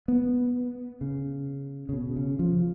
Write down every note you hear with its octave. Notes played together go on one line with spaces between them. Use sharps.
B3
C#3
C#3
B2
C#3
F3